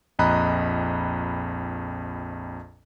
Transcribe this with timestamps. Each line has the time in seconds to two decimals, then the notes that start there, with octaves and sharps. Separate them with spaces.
0.19 A#1 F2 D#5 A#5 B5 F#6